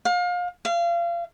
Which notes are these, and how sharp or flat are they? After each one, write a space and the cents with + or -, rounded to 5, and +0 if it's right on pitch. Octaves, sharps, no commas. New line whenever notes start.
F5 +30
F5 -30